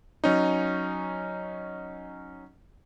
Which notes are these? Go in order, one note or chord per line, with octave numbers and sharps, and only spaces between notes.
F#3 C#4 D#4